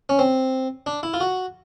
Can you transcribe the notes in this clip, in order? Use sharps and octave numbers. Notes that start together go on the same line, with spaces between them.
C#4
C4
D4
E4
F4
F#4